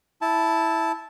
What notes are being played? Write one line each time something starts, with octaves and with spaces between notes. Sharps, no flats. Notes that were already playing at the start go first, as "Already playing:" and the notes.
E4 A5